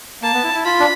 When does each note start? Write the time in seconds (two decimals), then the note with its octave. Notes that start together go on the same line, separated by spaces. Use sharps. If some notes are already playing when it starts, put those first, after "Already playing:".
0.22 A#3 A5
0.33 B3
0.44 E4
0.54 E4
0.65 F4 B5
0.79 D4